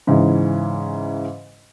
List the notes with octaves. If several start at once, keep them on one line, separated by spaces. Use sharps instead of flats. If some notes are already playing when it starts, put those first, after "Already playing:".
G#2 C#3 E3